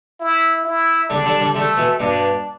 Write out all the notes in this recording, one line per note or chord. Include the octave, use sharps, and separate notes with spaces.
E4
E4
D3 G3 D4
D3 G3
D3 G3
D3 G3 A3
B2 E3
G2 B2 D4